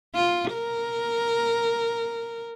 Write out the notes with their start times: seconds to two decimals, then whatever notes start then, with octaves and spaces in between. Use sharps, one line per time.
0.15 F4
0.54 A#4